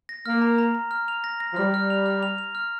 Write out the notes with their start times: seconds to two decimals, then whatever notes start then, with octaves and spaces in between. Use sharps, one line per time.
0.09 A#6
0.26 A#3 F6
0.42 A#5
0.58 A#5
0.75 A#5
0.91 F6
1.08 F7
1.24 A#6
1.40 A#6
1.53 F3
1.56 G3 F6
1.74 F6
1.90 F7
2.06 F6
2.23 F7
2.38 F7
2.55 F6